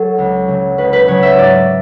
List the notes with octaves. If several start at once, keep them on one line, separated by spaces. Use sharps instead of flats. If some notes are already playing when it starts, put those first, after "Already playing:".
Already playing: F#3 A4
C#2
C#3 F#3
C#2 B4
B4
C#3 F#3 C#5
E5
G#2 D5